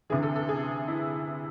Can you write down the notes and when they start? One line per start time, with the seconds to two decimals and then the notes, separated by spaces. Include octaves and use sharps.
0.10 D2 C3 E3 G#4
0.23 A4
0.36 A4
0.49 G#4
0.88 E4